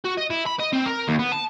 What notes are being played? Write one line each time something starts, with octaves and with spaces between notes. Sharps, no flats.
F#4
D#5
E4
B5
D#5
C4
A#4
D#2
B3
A5